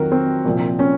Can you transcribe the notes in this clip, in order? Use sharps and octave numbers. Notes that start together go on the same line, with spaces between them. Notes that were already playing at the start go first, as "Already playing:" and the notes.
Already playing: F2 D#3 F#3 F#4 A#4
C4
C2 A#2 F3
C#4